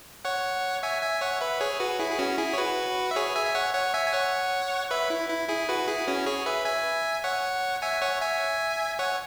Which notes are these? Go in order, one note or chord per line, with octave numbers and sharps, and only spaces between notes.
C#5 F#5
E5 G#5
E5 G#5
C#5 F#5
B4 E5
G#4 C#5
F#4 B4
E4 G#4
G#4
C#4 F#4
E4 G#4
C#5
F#4 B4
E5
G#4 C#5
E5 G#5
E5
C#5 F#5
C#5 F#5
E5 G#5
G#5
C#5 F#5
B4 E5
E4
E4
E4 G#4
F#4 B4
E4 G#4
C#4 F#4
G#4 C#5
B4 E5
E5 G#5
C#5 F#5
E5 G#5
C#5 F#5
E5 G#5
C#5 F#5